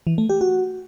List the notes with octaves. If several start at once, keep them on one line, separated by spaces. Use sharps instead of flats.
E3
A3
G4
F#4